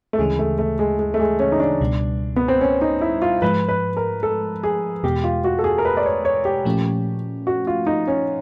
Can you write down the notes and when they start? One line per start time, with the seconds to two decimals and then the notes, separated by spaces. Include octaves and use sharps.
0.13 A3
0.18 D2 C#3 E3 G#3
0.39 A3
0.59 A3
0.79 G#3
0.99 G#3
1.14 A3
1.20 G#3
1.39 C#4
1.52 D#4
1.60 D4
1.80 C#2 B2 G3
2.36 B3
2.48 C4
2.61 C#4
2.82 D#4
3.01 E4
3.22 F4
3.42 G#2 F3 G#3 B4
3.69 B4
3.97 A#4
4.23 A4
4.63 G#4
5.03 E2 B2 G#3 G4
5.24 F4
5.44 F#4
5.59 A4
5.64 G#4
5.78 A#4
5.85 B4
5.97 D5
6.06 C#5
6.25 C#5
6.45 G4
6.65 A#2 F3 A3 C#4
7.47 F#4
7.67 F4
7.87 D#4
8.07 C#4